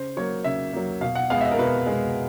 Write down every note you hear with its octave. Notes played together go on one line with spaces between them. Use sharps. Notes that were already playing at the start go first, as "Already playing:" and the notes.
Already playing: C#3 C5
F#3 A#3 C#5
C#3 E5
F#3 A#3
B2 F5
F#5
G#3 B3 F5
E5
D#5
A#4
B2 B4
G#3 B3